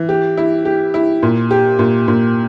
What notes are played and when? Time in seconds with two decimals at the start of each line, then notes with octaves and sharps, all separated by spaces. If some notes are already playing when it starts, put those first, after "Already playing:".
Already playing: E3
0.09 G4
0.37 E4
0.65 G4
0.94 E4
1.23 A#2
1.51 G4
1.79 A#2
2.08 A#2